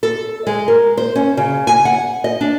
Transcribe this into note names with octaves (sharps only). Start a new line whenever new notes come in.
A4
G#3
A#4
C5
C#4
C#3
G#5
F#5
D#5
D4